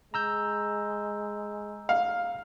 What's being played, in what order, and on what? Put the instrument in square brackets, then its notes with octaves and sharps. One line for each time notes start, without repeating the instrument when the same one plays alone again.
[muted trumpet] G#3 [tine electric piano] A#5 E6 G6
[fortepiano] F5